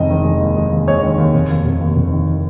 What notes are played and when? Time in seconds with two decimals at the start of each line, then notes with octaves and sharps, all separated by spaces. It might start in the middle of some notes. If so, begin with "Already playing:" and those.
Already playing: F1 D#3 G#3 D#5
0.10 D#3
0.24 G#3
0.41 D#2
0.57 G#3
0.71 D#2
0.87 G#3 C#5
1.03 D#3
1.18 D#2
1.34 F1
1.50 D#2
1.65 F1
1.81 D#2
1.96 F1
2.11 D#3